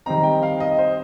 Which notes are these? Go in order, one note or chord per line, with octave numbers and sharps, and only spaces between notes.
D#3 G3 C4 D#4 A#5
G5
F5
D#5
C5